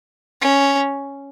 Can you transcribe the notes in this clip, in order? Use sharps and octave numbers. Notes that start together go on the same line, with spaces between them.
C#4